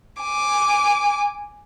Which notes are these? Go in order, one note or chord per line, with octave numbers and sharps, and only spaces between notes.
G#5 D6